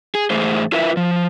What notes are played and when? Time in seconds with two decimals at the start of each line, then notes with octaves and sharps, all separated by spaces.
0.15 G#4
0.30 G#2 E3 A3 G#4 C5
0.72 E4 F4 A#4 B4 E5
0.97 F3